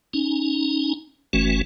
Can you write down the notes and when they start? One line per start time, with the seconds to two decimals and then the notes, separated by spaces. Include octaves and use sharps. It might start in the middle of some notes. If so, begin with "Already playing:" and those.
0.13 C#4 D#4
1.33 G1 E3 A3 C#4 F#4